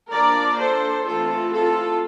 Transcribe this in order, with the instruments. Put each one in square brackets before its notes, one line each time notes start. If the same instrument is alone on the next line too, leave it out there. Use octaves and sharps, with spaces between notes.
[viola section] F3 A#3 D4 A#4 D5
A4 C5
E3 A3 C4 F4 A4
F4 A4